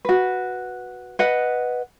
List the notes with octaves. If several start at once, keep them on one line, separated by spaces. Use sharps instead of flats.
F#4 B4
B4 D#5 F#5